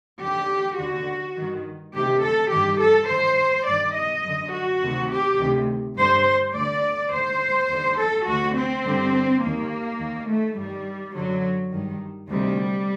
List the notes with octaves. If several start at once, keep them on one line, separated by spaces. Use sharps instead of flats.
D#2 D3 G4
D#2 D3 F#4
G2 D#3
D2 C3 D#3 G4
A4
G2 D#3 G4
A4
G2 D#3 C5
G2 D#3 D5
D#5
F#2 D3
F#4
D2 C3 D#3
G4
D2 C3 D#3
G2 D3 C5
D2 D3 D5
D#2 D3 C5
D#2 D3
A4
D2 D3 F#4
C4
G2 D3
D#2 D#3 A#3
D#2 D#3
A3
G2 D#3 G3
F#2 D3 F#3
G2 D#3
D2 C3 D#3 G3